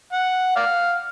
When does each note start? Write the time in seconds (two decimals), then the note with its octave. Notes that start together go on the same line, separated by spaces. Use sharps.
0.13 F#5
0.56 D5 F5